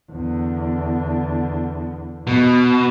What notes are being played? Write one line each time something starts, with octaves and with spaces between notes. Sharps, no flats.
E2 D3
B2